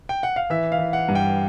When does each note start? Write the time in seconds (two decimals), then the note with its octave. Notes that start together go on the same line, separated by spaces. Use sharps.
0.09 G5
0.23 F#5
0.36 F5
0.50 E3 E5
0.72 F5
0.79 E3
0.93 F#5
1.08 G2
1.15 G5